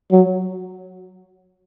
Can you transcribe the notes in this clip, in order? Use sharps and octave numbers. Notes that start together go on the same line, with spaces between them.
F#3